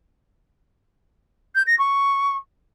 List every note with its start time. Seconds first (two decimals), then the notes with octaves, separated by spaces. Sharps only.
1.55 G6
1.67 A#6
1.79 C#6